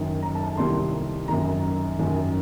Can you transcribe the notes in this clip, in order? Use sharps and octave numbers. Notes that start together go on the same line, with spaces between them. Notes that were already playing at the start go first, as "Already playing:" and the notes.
Already playing: F#2 D#3
A#5
A5
A5
C2 C3 D#3 C6
F#2 D#3 A#5
F#2 D#3